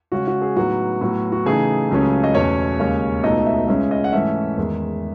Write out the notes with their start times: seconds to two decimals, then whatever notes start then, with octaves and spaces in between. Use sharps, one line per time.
0.12 C#3 G#3 C#4 F#4
0.27 F#4
0.42 G#4
0.56 A2 F#3 B3 D#4 F#4
1.01 A2 F#3 B3
1.32 F#4
1.46 C#3 E3 A3 D#4 G#4
1.91 C#2 C#3 F#3 A3 C#4
2.24 D#5
2.35 E2 B2 A3 C#4 C#5
2.79 D#2 C#3 G#3 C#4
3.23 C#2 B2 A3 D#4 D#5
3.46 E5
3.68 C#2 C#3 G#3 C#4 E5
3.91 D#5
4.04 F#5
4.13 G#2 E3 A3 C#4 E5
4.57 E2 D#3 G#3